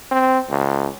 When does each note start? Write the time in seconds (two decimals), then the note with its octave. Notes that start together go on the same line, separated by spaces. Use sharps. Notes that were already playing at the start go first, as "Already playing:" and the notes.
0.11 C4
0.50 C#2